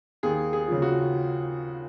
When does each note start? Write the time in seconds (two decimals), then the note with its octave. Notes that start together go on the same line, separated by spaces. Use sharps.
0.23 D#2 G#4
0.53 G#4
0.68 C#3 F3
0.82 F#4